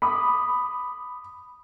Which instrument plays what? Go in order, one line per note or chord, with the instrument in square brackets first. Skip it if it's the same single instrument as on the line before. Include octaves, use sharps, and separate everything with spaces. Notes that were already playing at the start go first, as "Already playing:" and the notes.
[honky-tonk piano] B5 D6 D#6